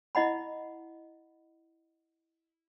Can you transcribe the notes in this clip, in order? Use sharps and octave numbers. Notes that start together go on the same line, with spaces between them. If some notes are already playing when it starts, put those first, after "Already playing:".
E4 D#5 F#5 B5